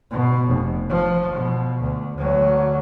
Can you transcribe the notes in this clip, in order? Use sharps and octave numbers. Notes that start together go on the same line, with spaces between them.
B2
F1
F3
B2
D2
D2 F#3